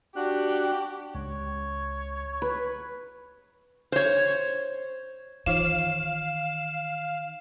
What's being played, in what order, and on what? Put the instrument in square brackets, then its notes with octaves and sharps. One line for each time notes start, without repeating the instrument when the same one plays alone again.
[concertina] D4 F#4 F#6 [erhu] G4
[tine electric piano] C#2 [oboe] C#5
[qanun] B4
[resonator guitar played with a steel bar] C5 C#5
[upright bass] D#3 [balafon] E3 F4 C5 [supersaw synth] F5 [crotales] E7